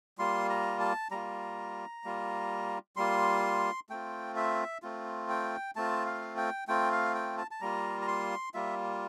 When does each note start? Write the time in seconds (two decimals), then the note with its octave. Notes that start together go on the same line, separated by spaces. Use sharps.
0.18 G3 A#3 F4 C6
0.50 A#5
0.80 A5
1.11 G3 A#3 F4 A#5
2.04 G3 A#3 F4
2.96 G3 A#3 F4 C6
3.89 A3 C4 F4 G5
4.36 E5
4.82 A3 C4 F4
5.29 G5
5.76 A3 C4 F4 A5
6.06 F5
6.37 G5
6.68 A3 C4 F4 G5
6.92 F5
7.15 G5
7.38 A5
7.51 A5
7.61 G3 A#3 F4 A#5
8.02 A#5
8.07 C6
8.54 G3 A#3 F4 E5